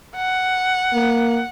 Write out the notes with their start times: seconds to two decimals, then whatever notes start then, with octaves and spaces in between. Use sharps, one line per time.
0.17 F#5
0.93 A#3